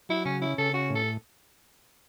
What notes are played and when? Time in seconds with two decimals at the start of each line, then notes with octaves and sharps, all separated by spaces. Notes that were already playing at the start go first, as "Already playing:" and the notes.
0.09 F#3 E4
0.25 C#3 C#4
0.42 C#4 E4
0.58 C#3 A4
0.74 C#4 F#4
0.90 A2
0.95 A4